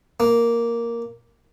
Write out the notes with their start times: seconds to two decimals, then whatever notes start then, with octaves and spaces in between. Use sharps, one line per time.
0.20 A#3